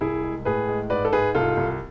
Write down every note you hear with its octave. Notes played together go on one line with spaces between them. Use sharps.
C2 E4 G#4
G#3
A2 G#4 B4
G#3
G#2 B4 D5
A4
G#2 G#4 B4
C2 F4 A4
C2